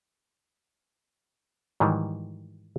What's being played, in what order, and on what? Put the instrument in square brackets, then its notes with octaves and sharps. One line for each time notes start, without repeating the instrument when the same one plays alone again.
[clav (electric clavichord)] G#2 D#3 E3 F#3 G3